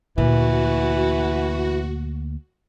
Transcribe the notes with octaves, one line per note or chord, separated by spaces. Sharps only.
D2 A#2 E3 A#3 F#4